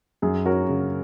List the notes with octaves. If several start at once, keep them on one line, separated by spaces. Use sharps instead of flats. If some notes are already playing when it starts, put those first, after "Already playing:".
F#2 G#4
C#4 F#4 A#4
C#3